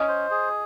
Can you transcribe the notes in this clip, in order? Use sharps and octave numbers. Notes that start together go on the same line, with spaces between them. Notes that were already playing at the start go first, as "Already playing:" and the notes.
Already playing: C#4 D#5 D#6
C5
G#4